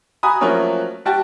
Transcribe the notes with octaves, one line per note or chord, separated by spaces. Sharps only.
F#4 G#5 A#5 B5 D#6
F3 F#3 A3 A#3 C#4 F#4
G3 F#4 G5 A5